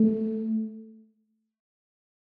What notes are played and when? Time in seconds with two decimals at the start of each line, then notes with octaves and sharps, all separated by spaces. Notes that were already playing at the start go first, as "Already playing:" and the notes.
Already playing: A3